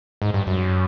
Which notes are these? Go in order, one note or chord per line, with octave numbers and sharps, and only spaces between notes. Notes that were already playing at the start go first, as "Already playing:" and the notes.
G#2
G2
F#2